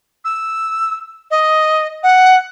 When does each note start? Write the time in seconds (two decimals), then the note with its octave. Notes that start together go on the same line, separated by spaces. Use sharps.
0.25 E6
1.31 D#5
2.03 F#5